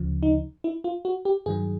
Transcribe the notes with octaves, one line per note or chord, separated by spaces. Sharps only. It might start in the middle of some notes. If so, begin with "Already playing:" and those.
Already playing: D2 C#3 F3
D#4
E4
F4
F#4
G4
G2 D#3 F#3 G#4